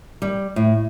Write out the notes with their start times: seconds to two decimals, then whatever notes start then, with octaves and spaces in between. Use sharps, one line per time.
0.22 G3
0.56 A2